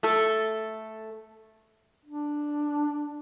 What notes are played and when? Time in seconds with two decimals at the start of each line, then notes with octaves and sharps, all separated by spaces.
0.03 A3 A4
2.05 D4